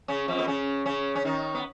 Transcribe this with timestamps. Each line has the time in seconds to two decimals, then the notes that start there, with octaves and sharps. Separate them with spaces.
0.08 C#3 C#4
0.28 F2 F3
0.39 B3
0.47 C#3 C#4
0.85 C#3 C#4
1.15 C#4
1.25 D#3 D#4
1.55 B3